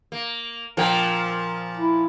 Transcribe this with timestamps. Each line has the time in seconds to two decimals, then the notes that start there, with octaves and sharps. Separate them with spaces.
0.12 A#3
0.77 A#2 F3 A#4 G5
1.77 E4